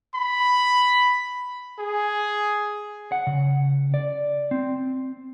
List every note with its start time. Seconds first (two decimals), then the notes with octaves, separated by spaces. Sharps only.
0.15 B5
1.79 G#4
3.12 F#5
3.27 C#3
3.94 D5
4.51 C4